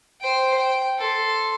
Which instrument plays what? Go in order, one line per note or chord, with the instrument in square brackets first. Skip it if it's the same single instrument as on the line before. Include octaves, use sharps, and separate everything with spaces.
[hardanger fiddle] C5 G5
G5
A4 C6